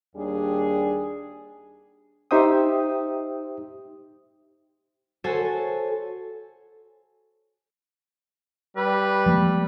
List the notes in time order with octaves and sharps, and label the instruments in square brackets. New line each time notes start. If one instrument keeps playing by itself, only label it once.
[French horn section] D#2 G3 D4 G#4
[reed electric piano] D#4 G4 C5 E5 G5 D#6
[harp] F#4 A4 C5 C#5 G#5 A5
[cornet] G3 [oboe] B4
[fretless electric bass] F3 G#3 A#3